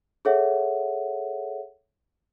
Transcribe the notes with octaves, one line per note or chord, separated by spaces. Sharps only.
G#4 A4 C#5 E5 F#5